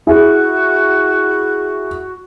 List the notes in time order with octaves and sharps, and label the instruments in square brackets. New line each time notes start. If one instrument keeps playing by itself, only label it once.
[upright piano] E4 G#4 [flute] F#4